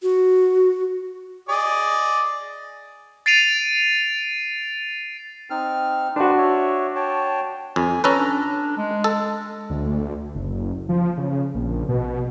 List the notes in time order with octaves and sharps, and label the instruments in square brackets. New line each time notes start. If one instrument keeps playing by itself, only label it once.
[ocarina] F#4
[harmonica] G#4 D5 D#5
[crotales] A6 C7 D7 D#7 F7
[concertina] C4 D#4 F6
[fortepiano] D4 F#4 [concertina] B4 C5
[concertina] C#5 E5
C#5 G5 A5
[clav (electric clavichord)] F2 [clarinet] G#5
[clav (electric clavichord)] C#4 A4 B4 [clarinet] A#5
[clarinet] D4
G#3
[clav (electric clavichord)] A4
[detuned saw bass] D2
F#1
F3
C#3
A#1
B2